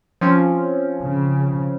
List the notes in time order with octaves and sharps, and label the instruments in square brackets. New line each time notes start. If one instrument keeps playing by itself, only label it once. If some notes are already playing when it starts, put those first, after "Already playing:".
[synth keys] F3 C4 C#4
[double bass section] C#3